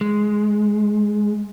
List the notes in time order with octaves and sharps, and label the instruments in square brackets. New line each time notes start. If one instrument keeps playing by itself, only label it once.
[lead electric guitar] G#3